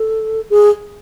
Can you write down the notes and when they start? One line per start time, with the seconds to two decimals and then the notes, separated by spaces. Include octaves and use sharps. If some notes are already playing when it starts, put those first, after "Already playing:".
Already playing: A4
0.50 G#4